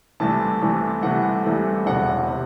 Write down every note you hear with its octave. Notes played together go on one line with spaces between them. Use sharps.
C2 C3 E3 A3 A5
C2 C3 E3 A3
C2 C3 E3 A3 F#5
C2 C3 E3 A3
E1 E2 C3 F#5
C3